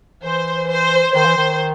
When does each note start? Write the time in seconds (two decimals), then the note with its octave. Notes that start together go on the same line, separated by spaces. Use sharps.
0.23 E3 C5
0.68 C5
1.14 D#3 C5
1.25 E3
1.37 D#3